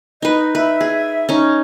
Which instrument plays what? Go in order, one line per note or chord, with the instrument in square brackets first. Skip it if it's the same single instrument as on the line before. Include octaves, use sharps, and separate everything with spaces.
[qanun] D#4 B4 [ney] D#5
[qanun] B4 [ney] E5
[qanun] G#4
C#4 D#4